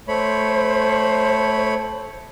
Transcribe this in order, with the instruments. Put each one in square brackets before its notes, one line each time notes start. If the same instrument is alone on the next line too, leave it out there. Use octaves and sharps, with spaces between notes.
[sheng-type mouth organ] A3 C#5 B5 [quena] C5